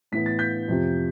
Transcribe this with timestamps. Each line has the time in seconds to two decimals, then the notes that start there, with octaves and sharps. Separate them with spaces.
0.12 A2 E3 B3 B6
0.26 A6
0.39 G6 B6
0.68 F2 C3 F3